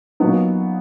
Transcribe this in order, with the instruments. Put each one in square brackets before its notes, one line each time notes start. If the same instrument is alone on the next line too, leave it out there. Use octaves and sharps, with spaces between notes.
[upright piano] A#2 F#3 B3 D#4